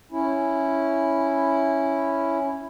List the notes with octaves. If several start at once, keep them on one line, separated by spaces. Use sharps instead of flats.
C#4 E4